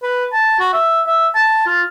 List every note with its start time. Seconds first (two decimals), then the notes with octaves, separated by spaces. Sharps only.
0.03 B4
0.33 A5
0.60 F#4
0.73 E5
1.06 E5
1.35 A5
1.67 F4